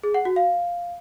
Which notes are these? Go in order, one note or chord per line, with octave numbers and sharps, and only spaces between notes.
G#4
F#5
F#4
F5